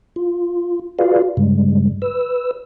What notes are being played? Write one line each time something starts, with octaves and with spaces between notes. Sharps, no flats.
F4
F4 F#4 G#4 B4 D5 F5
G2 C#3 G3 G#3
B4 E6